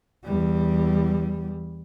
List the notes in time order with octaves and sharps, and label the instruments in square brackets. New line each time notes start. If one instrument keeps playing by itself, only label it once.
[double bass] E2 G3